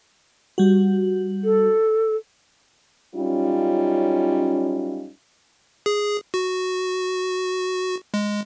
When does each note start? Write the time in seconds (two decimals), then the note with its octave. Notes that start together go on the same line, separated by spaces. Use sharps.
0.58 G3 F#4
1.44 A4
3.15 F#2 G3 C#4 D#4 F4
5.86 G#4
6.34 F#4
8.14 G#3